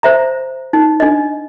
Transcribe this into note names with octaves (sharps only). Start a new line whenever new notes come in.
C5 E5 A#5
D#4
D4 D#5